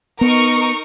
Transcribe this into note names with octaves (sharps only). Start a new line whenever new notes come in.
B3 D#4 A#4 C#6